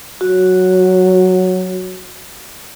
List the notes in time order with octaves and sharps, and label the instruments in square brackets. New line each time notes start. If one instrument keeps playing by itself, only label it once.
[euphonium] F#3 [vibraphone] F#4